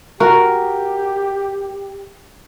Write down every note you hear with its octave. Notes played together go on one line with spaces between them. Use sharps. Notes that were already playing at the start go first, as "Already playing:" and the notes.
F#4 G4 A#4